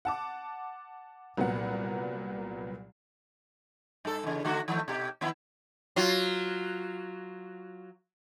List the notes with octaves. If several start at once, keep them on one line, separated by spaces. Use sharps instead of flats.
F#5 A5 D6
C2 A#2 F#3 B3 F#5
G2 A4
E2 C#3
D3 A3 F#4
D#3 F3 A3
B2 G4
D#3 B3 E4
F#3 F4